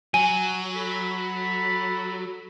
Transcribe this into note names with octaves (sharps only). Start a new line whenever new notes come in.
F#3 G#5
A4 B5